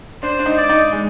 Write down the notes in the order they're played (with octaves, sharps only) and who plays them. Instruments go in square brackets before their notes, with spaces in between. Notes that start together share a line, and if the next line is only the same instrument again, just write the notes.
[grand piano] D4 [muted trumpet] C5
[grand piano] D4
D#4
[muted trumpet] D5
[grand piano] D#4
G#3